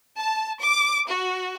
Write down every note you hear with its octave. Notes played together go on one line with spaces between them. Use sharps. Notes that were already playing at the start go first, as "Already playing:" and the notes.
A5
D6
F#4